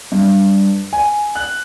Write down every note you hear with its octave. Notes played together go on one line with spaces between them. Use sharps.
G2
G#5
F#6